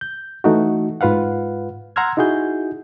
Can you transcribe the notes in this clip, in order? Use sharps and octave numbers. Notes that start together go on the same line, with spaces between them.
G6
E3 A3 D#4 F#4
G#2 F4 B4 F5 F#5
F#5 A#5 C6 E6 F6 G#6
D#4 E4 F#4 G#4 G6